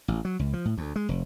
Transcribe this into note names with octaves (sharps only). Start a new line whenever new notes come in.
A1
F#3
C#2
F3
A2
D2
G#3
F1